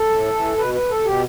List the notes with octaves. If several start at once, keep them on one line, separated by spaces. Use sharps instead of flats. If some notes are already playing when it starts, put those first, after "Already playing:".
Already playing: A4
A2
E3
B2 B4
B4
A4
B2 G4